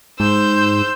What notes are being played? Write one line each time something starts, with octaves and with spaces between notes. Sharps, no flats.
G#2 C5 E6 G6